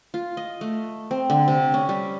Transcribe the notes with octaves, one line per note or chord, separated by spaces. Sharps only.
F4
D#5
A3
C4
D3
C3
C#4
G3